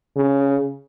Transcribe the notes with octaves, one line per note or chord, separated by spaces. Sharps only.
C#3